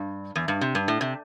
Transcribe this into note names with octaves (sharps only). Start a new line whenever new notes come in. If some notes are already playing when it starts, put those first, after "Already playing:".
Already playing: G2
E2
G2
C3
G2
A2
C3